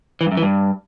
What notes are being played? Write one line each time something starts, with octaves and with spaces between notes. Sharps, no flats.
E3
G2
F#2
E3
G2